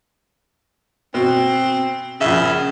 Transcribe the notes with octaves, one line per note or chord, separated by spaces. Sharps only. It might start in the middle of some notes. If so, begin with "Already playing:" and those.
B2 C4
A#1 C#3 E5